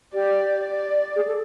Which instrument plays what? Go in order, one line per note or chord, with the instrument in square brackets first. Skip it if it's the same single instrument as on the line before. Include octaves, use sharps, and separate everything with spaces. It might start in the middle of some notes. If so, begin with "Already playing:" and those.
[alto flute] G4 [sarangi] D5
[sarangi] D5
[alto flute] G#4
A4